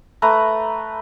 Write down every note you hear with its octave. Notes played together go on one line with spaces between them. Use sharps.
A3 B4 A#5